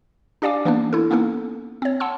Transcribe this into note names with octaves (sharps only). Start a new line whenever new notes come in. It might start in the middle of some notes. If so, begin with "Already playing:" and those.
D4 G4 D5 F5 G#5 D6
E3 A#3 B3 C#4 D4
E4 A4
A#3 B3 C#4 D#4 A4
C4 C#5
F#5 A5 C6 E6